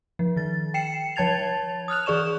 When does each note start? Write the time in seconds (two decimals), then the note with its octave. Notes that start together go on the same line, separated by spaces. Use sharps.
0.19 F3
0.36 D#3 A6
0.74 G5 C7 C#7 E7
1.16 F3 C#5 A5 G#6 A6 F7
1.88 D#6 F6 F#6 F7
2.06 E3 G#4 D5 C#6 E7